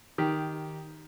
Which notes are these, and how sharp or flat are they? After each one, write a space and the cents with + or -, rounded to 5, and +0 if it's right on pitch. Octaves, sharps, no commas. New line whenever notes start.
D#3 +0 G4 +0